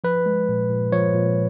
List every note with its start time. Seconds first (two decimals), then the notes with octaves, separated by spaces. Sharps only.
0.04 F3 B4
0.26 G#3
0.49 A#2
0.70 A#2
0.92 F3 C#5
1.14 A#2